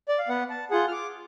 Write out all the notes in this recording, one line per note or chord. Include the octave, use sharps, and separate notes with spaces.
D5
F5
B3 F#5
A5
F4 G#4 F#5
F6
D6